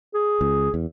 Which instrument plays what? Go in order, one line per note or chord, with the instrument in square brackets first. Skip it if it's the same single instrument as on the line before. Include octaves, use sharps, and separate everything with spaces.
[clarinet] G#4
[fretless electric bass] C#2
E2